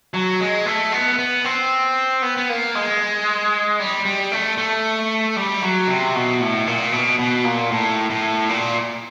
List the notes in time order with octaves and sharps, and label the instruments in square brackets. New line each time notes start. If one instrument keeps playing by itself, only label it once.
[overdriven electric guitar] F#3
G#3
A3
B3
B3
C4
B3
B3
A#3
G#3
G3
G3
A3
A3
G3
F#3
C3
B2
A2
A#2
B2
B2
A#2
A2
A2
A#2